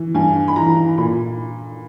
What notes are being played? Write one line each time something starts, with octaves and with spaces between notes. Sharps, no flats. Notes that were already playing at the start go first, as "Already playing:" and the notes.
Already playing: E3
G2 G#5
B5
E3 A#5
A#2 B5